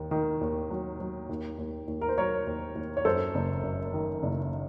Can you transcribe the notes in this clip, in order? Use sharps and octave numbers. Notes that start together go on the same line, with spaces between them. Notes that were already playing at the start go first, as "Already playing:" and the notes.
Already playing: D#2 D#3
D#3
D#2
F#3
F#3
D#2
D#2
D#2
A#4
C5
F#3 A#4 C#5
D#2
D#2
C#5
F#2 A4 C5
F#1
F#2
D#3
F#1